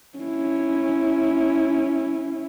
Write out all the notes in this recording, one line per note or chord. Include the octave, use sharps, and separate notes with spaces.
C#4 E4